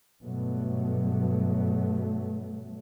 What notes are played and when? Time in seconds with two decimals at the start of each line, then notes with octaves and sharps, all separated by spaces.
0.22 G2 B2 F#3 A3